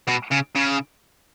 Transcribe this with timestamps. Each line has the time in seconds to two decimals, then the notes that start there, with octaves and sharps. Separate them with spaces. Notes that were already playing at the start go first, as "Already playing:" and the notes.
0.08 B2
0.32 C#3
0.56 C#3